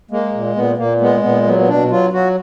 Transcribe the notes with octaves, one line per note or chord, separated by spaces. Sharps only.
G#3 A#3
A#2
A#2 B3
A#2 A#3
G#3 B3
A#2 B3
F#3 B3
B3
B2 D4
F#3 F4
F#3 F#4